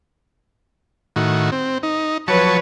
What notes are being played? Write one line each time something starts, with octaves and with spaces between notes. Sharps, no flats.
A2 D#3 F#4
C4
D#4
F3 F#3 B4 C#5 A5 C#6